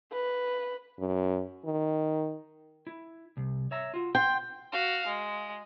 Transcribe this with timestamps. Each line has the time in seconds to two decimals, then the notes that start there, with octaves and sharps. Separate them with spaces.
0.12 B4
0.99 F#2
1.65 D#3
2.87 E4
3.37 C2
3.71 C#5 E5 A#5
3.94 F4 F#4
4.15 G5 C6
4.72 F#4 F5
5.07 G#3